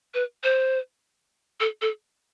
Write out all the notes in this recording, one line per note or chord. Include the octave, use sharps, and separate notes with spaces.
B4
C5
A4
A4